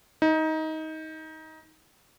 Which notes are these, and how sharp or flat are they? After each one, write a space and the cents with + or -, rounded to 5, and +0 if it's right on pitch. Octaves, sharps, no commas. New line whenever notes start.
D#4 +20